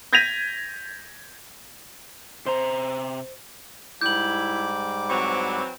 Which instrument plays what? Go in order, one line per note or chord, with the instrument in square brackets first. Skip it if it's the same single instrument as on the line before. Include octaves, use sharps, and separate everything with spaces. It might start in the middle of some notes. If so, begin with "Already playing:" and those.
[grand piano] G6 G#6 A#6 B6 D#7 F7
[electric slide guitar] C3 A#5 [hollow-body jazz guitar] C5
[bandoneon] G#2 G3 D6 [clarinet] E4 [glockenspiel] G6 F#7
[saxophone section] E3 F#3 C4 [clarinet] C#6